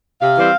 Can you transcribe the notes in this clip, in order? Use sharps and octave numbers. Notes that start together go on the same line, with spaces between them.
C3 F5
E3 G3 C4